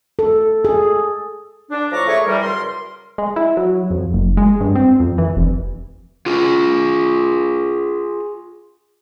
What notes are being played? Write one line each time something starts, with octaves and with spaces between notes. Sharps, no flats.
A4
G#4
D4
A2 F3 A4 A#5 C#6 D6
A#2 A3 G#4 C#5 C#6
E3 G3 A#4
F#2 C#3 A#4 C6
G#3
E4
F#3
F2
F#1
G#3
G2
C4
F2
E3
F1
F4 G#4